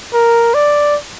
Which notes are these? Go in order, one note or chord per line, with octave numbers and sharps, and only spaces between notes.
A#4
D5